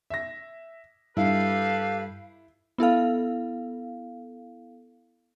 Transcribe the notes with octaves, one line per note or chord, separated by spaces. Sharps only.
E5 A#6
G2 E4 G4 A4 B4 F5
B3 E4 A4 F5